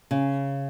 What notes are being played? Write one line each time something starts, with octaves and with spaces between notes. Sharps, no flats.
C#3